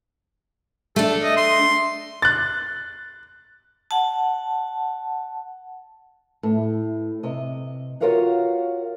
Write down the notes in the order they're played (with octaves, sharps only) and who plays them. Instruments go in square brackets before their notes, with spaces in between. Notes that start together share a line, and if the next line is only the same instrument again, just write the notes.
[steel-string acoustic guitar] A3 D4 [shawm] A4
[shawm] D#5
C6
[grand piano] F#6 A6
[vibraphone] F#5 A5
[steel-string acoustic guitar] A2
C3 D#5
F4 F#4 A#4 C#5 F5 F#5